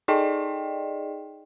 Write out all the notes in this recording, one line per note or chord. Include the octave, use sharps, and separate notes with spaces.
D#4 G#4 D5 D#5 G5